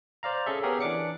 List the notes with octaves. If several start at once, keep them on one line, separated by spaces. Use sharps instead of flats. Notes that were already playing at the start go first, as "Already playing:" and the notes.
C5 D5 F5 A#5
C#4 G#4 A4 E5
B3 C#4 G4 G#4 A#4
E3 D4 D6 C#7